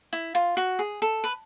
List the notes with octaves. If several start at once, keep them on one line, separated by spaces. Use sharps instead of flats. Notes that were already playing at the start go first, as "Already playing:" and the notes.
E4
F4
F#4
G#4
A4
B4